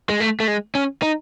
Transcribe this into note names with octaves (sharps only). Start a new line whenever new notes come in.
G#3
A3
A3
G#3
C#4
D#4